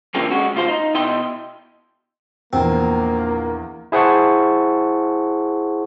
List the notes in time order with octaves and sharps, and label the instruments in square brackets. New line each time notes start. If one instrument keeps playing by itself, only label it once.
[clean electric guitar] D3 F3 A3 A#3 C4 C#4
G#3 C#4 F#4
D2 F4 C5
D#4
B2 E4 D#5 G5 C6
[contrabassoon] A#1 [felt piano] E2 [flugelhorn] A#3 [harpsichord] C4
[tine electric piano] E4 G#4 C5 F#5 A5 C#6